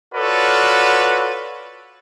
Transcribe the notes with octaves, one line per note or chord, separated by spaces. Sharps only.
F4 F#4 A4 B4 C#5 D5